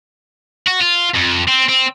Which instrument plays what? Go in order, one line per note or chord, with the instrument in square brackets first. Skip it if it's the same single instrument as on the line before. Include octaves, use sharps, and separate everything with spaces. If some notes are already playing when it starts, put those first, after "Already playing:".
[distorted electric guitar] F#4
F4
F2
C4
C4